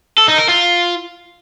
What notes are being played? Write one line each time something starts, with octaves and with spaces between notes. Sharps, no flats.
A4
D#4
A#4
F4